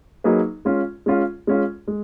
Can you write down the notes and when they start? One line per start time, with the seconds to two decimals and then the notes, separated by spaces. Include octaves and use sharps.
0.24 F#3 A#3 D#4 G#4 B4
0.65 G#3 C#4 F4
1.06 G#3 C#4 F4
1.47 G#3 C#4 F4
1.88 G#3